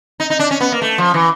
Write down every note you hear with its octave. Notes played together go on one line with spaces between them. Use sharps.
D#4
D#4
D4
C#4
B3
A#3
A3
F3
E3